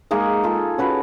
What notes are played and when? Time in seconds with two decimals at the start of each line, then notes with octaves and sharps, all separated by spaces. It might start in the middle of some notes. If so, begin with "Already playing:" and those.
0.11 G#3 A#3 D#4 G#4
0.43 F4 G#4 A4
0.78 C#4 F#4 B4